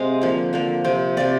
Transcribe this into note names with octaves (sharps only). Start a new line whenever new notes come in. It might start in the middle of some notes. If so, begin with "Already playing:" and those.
Already playing: C3 G#3 C4 D#5 F5
D3 F3 A#3
D3 F3 A#3
C3 F3 C4
C3 F3 C4 D5